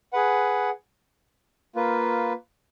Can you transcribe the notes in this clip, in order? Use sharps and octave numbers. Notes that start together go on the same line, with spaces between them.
G#4 B4 F#5
A#3 F4 B4